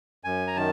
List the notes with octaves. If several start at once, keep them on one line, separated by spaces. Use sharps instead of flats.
F#2 G#5
A#5
D#3 A5